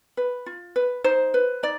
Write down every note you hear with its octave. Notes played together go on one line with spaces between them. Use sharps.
B4
F4
B4
D#4 C5
B4
D#4 D5